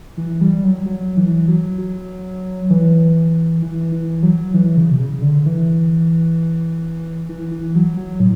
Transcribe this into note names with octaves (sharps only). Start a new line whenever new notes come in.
E3
G3
F#3
F#3
E3
F#3
F#3
E3
E3
E3
F#3
E3
C#3
B2
C#3
D3
E3
E3
E3
F#3
F#3
A2